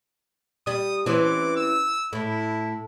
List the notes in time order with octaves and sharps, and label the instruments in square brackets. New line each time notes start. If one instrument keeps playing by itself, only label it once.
[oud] G3 [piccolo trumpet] D#6
[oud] E3 C4 C#4 [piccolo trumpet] D6
[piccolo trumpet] E6
[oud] A2 [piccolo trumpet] E4